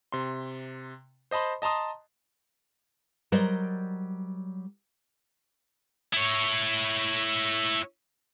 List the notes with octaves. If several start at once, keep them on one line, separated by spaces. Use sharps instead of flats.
C3 C6
C5 D#5 A5 B5 C6
D#5 A5 A#5 C6 D#6
F#3 G3 A#4 C5 D5 D#5
E4 C#5